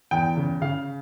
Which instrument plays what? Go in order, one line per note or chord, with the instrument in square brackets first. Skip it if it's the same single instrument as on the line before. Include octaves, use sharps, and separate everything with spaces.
[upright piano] E2 G5
C#3
C#3 F5